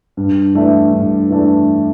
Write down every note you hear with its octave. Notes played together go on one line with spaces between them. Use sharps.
G2
E3 A3 D4
G2
E3 A3 D4